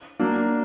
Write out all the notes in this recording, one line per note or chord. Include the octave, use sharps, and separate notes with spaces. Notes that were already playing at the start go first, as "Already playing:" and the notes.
F#3 A#3 D4